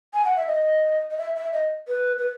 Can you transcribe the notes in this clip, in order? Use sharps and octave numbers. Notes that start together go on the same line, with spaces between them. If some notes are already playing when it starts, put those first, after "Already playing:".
G#5
F#5
E5
D#5
D#5
E5
E5
D#5
B4
B4